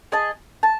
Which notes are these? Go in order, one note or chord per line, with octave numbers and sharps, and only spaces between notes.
G#4 D#5 A5
A5